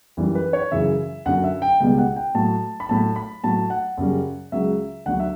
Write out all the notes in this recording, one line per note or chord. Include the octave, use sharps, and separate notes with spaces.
F#2 E3 G3
B4
C#5
F#2 C#3 E3 E5
F#2 D3 F#3 F#5
E5
G5
C#2 B2 G3 G5
F#5
G5
A2 F#3 A5
B5
A2 F#3 A5
B5
A2 F#3 A5
F#5
F#2 C#3 G3
C#2 C#3 F#3 E5
D2 D3 F#3 F#5
E5